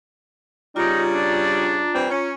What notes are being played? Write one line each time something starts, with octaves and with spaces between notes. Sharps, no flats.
C#3 G3 D#4 F4 A#5
D4
E3 G3 C4
C#4